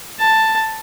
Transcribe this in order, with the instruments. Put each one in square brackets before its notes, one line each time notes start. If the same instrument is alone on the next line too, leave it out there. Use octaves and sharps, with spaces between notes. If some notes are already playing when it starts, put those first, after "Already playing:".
[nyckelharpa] A5